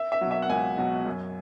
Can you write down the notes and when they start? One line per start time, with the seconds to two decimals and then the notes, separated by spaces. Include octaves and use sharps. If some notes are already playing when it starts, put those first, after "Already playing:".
Already playing: E5
0.12 E5
0.21 B2 F#3
0.31 E5
0.42 F#5
0.49 C#2 G#5
0.78 B2 F#3
1.06 F#2